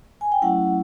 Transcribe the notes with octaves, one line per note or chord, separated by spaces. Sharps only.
G#5
G5
F#3 A3 C#4 E4 F#5